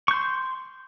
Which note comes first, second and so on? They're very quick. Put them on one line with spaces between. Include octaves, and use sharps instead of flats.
C#6 G6 C6